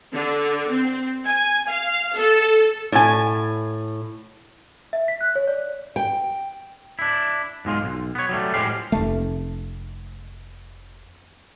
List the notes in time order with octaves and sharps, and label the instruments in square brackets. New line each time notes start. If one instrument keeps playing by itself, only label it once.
[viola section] D3
C4
G#5
F5
A4
[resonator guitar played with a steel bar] A2 G#5
[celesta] E5
B6
F#6
C#5
D5
[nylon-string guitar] G5
[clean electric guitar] D4 E4
B1 G#2 G#3 F4
B1
B3 C#5
F#3 G3 A3
A2 F3 G#3 G4 F5
[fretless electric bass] F1 A3